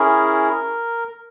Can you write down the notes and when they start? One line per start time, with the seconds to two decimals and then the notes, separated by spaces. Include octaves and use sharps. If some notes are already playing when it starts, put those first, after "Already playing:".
Already playing: C#4 E4 G#4 A#4